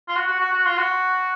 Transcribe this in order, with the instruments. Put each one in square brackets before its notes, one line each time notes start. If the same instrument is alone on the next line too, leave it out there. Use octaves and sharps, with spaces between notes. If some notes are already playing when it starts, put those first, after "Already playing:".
[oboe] F4
F#4
F#4
F#4
F#4
F4
F#4